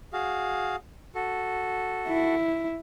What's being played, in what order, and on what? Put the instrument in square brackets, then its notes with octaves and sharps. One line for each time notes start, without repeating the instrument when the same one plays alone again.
[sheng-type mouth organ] F#4 G#4 F5
F#4 A4
[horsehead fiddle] E4